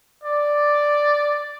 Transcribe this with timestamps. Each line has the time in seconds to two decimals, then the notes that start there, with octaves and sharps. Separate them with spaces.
0.24 D5